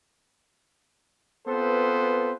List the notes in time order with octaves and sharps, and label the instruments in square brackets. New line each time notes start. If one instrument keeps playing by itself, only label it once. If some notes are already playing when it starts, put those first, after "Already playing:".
[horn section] B3 C4 F4 A4 B4 C5